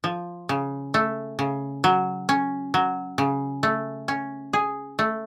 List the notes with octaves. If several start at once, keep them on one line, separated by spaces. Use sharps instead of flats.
F3
C#3
A3
C#3
F#3
C#4
F#3
C#3
A3
C#4
G#4
A3